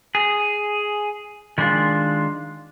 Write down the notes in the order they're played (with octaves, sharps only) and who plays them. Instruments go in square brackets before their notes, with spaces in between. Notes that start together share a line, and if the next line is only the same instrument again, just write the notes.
[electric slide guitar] G#4
D#3 G#3 D4 F4